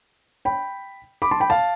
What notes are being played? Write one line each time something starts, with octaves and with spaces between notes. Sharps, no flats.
G5 B5
B5 D6
A5 C6
G5 B5
F5 A5